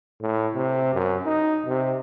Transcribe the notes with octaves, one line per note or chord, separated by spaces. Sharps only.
A2
C3
F#2
D#4
C3